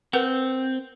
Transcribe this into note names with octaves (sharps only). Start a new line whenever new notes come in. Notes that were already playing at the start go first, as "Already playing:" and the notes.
C4 A#4 B4 F#5